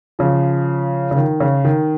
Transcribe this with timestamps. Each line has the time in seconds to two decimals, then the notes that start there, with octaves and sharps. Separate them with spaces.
0.19 C#3 F3
1.11 C#3
1.16 D#3
1.40 C#3
1.65 D#3